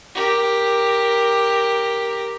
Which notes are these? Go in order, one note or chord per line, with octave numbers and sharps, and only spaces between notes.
G4 A#4